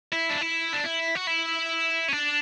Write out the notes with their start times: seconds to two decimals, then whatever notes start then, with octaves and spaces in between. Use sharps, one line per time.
0.13 E4
0.30 D4
0.41 E4
0.73 D4
0.84 E4
1.15 F#4
1.27 E4
2.08 C#4
2.13 D4